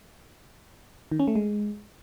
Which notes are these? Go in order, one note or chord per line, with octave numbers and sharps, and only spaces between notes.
D#3
C#4
A3
G#3